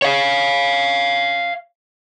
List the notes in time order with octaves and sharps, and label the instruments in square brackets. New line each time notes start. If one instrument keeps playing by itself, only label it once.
[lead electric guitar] C#5 F5